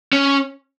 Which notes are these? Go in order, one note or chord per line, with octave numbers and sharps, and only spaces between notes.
C#4